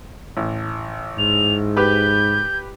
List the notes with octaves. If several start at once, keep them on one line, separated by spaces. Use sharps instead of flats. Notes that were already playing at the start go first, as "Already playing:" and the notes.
A1
G#2 F7
G4 B4 G6